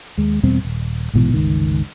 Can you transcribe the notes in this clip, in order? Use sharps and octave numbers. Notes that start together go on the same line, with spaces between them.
D#2 G#3
E2 B2 G3 C4
D#1
A#1 G#2 B2 E3
G1 C#2 D#3